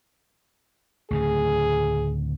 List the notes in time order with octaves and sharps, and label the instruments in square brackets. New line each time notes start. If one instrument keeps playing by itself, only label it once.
[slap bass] D2 A2 C#3 [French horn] G#4